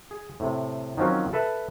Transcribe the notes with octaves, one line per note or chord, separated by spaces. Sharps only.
G#4
A2 C3
D#3 F3 F#3 C4 C#4
A4 B4 E5 A5